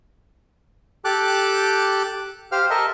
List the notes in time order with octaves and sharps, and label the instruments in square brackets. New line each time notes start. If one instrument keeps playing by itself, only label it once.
[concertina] G4 A4 A5 D6 F#6
G4 C5 F5 F6
A4 A#4 D#5 E5